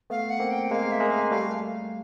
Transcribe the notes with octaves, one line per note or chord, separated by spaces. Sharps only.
A3 B3 F5
F#5
A#3 C4
G5
G#3 A#3 F5
E5
G#3 A#3
F5
G3 A3 F5